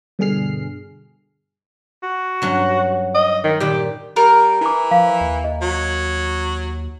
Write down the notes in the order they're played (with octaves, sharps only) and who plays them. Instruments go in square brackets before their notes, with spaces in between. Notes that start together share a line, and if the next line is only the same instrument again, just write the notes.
[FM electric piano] G2 B2 D3 G#4 F6 C7
[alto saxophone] F#4
[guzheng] G2 F#3 C#4
[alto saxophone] D#5
D#3
[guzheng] A#2 D#3 G3 [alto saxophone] G4
[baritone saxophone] G3 [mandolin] A#4
[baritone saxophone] E3 [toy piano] E4 D6
[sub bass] F3 [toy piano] F5
[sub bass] D#2
[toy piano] D#5
[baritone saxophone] F#3